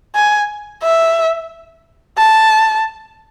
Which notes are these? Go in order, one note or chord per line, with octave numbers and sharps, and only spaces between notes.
G#5
E5
A5